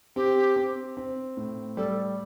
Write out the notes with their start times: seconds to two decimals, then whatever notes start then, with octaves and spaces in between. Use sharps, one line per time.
0.16 C4 G4
0.56 C4
0.97 C4
1.37 A2
1.77 G3 A4